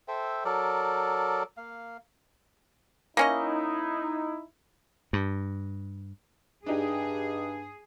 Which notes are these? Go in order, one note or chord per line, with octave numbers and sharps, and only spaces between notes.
A4 C5 E5 G5
F#3 A4 A#4 D5
A#3 F5
A#3 C#4 D#4 E4 D#5
G2
G2 D4 D#4 G4 G#4